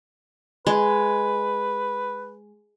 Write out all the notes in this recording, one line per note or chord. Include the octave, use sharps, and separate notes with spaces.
G#3 B4